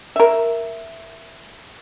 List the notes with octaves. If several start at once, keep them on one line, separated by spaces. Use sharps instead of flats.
A#4 E5